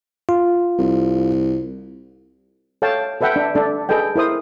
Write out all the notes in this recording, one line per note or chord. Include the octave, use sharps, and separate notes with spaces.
F4
C2
A4 C#5 F5 G5 A5
A4 B4 E5 F#5 G5
D4 E5
D4 A4
G#4 A4 B4 D#5 G5
E4 A#4 C5 D#6